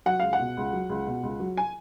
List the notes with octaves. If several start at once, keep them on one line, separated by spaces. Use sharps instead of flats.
F#3 F#5
C#2 F5
F#5
B2
C#2
F#3
C#2
B2
C#2
F#3
G#5